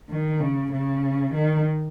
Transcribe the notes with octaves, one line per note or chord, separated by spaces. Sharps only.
D#3
C#3
C#3
D#3